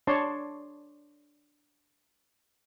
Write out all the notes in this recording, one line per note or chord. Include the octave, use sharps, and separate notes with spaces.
D4 C#5 D5 A5 C6